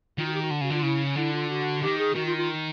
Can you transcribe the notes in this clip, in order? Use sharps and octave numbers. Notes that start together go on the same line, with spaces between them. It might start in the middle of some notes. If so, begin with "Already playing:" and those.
D#3 F4
F#4
G4
F#4
D3
C#3 F#4
D3 F4
C#3 E4
D3 E4
F4
F#4
D#3 G4
G#4
D#3 F#4
F4
F4